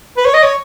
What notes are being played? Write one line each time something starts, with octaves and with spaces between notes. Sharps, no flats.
B4
C#5
D#5
C#5